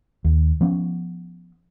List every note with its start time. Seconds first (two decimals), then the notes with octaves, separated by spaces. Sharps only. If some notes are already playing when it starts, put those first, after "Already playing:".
0.25 D#2
0.61 F3 B3 C#4